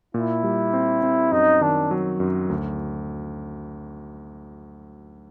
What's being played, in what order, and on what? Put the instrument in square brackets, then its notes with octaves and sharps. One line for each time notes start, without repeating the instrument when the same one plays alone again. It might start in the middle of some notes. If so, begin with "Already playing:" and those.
[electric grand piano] A#2 [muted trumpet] E4
[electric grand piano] G3
C4
C4
[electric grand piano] F#2 [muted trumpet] D#4
[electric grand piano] D#3 [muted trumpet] D4
[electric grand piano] F#3
F#2
D2